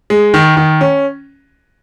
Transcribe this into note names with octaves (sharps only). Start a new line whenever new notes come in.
G#3
D#3
D#3
C#4